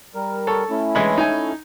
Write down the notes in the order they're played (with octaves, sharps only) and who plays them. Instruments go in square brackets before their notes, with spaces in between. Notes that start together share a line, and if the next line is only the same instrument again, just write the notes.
[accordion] G3 A#4
[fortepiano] A4 C#5
[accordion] A3 C#4 E4
[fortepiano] E3 G#3 B5
D#4 G#5